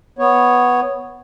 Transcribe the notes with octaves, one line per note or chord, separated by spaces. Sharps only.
B3 C#5